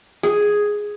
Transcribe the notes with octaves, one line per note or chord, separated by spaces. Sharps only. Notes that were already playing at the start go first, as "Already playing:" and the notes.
G#4